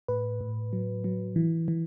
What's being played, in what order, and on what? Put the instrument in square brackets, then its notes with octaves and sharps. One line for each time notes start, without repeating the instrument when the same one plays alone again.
[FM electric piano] A2 B4
A2
F#3
F#3
E3
E3